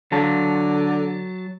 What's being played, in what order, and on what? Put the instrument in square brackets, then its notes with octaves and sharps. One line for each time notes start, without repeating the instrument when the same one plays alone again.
[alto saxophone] D3 [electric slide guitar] F#3 A5